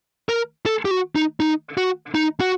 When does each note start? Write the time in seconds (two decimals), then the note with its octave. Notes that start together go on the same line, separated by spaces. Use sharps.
0.29 A#4
0.66 A4
0.85 G4
0.91 F#4
1.15 D#4
1.40 D#4
1.77 F#4
2.15 D#4
2.40 F#4